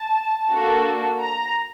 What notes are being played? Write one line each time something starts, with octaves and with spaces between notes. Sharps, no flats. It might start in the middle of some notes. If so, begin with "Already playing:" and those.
Already playing: A5
A#3 D4 F#4 A4
A#5